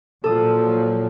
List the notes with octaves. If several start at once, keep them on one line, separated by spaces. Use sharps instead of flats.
A#2 F3 F#3 A4 D#6